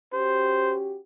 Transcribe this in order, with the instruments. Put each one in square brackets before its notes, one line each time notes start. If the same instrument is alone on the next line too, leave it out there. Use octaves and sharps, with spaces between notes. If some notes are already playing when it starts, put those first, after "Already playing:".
[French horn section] C#4 F#4 G4 [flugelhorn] C5